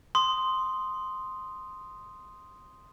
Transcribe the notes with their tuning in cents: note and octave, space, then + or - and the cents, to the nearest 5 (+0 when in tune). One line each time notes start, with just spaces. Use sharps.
C6 +0 D#6 +0